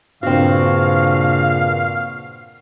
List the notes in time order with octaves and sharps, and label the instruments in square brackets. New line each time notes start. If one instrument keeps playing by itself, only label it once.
[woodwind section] G2 C#3 [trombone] A#2 [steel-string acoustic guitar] C4 F#4 [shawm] F5